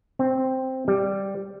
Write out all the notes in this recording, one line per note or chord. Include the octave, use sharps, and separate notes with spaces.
C4
G3